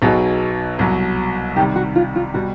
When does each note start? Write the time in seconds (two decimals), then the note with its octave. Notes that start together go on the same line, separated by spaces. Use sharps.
0.02 B1 B2 F#3 B3 D#4 G#4
0.79 C2 B2 F#3
1.56 C3 D#3 G3 G4
1.76 F#4
1.95 F4
2.16 F4
2.34 B2 G3 F#4